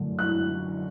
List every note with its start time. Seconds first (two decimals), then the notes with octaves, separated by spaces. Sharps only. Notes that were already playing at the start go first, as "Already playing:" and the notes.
Already playing: F#2 D3 A3
0.19 F#6